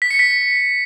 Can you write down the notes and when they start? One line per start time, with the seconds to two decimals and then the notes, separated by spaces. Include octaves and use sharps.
0.02 B6
0.11 C#7
0.19 B6